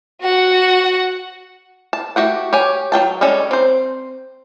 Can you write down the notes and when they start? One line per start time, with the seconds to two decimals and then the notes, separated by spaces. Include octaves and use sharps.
0.22 F#4 F#5
1.93 A5
2.16 A3 F#4 G4 F#5
2.53 G4 C#5 G#5
2.92 F#3 G#4 G5 A5
3.21 G3 G#3 C#4 A4
3.51 C4 C5